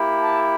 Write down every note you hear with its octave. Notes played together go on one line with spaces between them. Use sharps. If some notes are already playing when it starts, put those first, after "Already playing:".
Already playing: A#3 E4 G4
A5